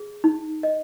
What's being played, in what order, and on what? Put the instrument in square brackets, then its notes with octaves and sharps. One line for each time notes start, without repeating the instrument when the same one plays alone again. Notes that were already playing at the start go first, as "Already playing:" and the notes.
Already playing: [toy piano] G#4
D#4
D#5